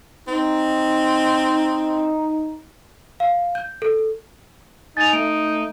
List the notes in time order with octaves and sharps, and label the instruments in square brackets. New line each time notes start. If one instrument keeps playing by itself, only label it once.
[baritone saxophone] C4 [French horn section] D#4
[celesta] F5
G6
A4
[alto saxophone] D#4 [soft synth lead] G#5 [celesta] A6 F7
[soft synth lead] A3 [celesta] D7